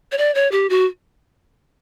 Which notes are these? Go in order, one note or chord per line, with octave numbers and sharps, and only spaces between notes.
C#5
D5
C#5
G4
F#4